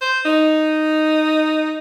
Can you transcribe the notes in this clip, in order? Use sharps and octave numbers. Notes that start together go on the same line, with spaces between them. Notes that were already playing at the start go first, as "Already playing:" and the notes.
C5
D#4